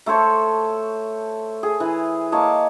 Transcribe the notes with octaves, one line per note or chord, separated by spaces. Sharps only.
A3 A4 C5 C#5
G#4
E3
A#3 C#5 D#5 A5